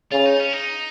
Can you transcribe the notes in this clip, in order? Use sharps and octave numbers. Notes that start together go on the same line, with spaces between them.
C#3 F4
D#4
C#4
D#4